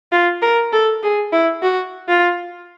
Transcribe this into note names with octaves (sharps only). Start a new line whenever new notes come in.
F4
A#4
A4
G#4
E4
F#4
F4